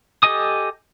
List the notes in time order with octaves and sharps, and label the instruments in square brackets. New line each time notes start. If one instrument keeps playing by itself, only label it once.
[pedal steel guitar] G4 A4 D#5 G#5 D#6